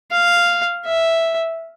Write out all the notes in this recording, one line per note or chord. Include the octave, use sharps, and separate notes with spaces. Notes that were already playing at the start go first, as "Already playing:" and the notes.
F5
E5